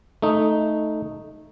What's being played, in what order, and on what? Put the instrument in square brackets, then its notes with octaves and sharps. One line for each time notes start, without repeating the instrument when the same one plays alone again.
[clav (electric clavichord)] A3 D#4